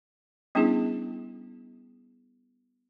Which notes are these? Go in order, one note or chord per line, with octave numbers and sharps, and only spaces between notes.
G3 B3 C#4 D4 E4 G#4